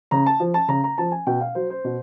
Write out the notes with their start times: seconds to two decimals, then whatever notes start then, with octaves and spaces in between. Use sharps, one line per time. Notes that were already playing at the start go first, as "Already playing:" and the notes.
0.11 C#3 A#5
0.26 A5
0.40 F3
0.54 A5
0.68 C#3 A#5
0.84 A#5
0.98 F3 A5
1.12 G#5
1.27 B2 G5
1.41 F5
1.55 F#3 C5
1.70 C5
1.84 B2